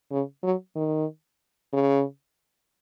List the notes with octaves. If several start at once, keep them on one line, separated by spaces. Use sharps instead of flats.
C#3
F#3
D#3
C#3